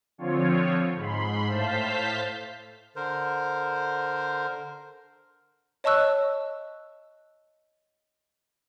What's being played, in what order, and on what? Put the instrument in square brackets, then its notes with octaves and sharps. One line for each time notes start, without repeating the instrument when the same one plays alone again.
[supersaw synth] D3 F3 C4 F4 C#5
G#2 B5 C6
A2 C5 F5 A5 G6 B6
[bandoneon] D3 A#4 C5
[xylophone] C#5 D#5 A5 C#6 E6 F#6